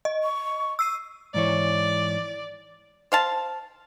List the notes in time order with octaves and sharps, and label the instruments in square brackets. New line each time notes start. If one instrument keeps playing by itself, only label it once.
[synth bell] D#5
[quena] C#6
[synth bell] E6 C7 D#7
[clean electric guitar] G#2 E3 C#5 [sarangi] D5
[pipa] C5 F5 A5